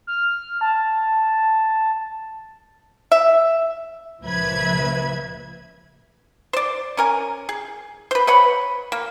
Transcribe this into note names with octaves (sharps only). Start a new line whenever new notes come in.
F6
A5
E5
C#2 A#2 F3 B4 E5 G#6
C5 D5
C#4 A#4 G#5
G#4
B4 C5
B4 C#5 F#5 B5
A#3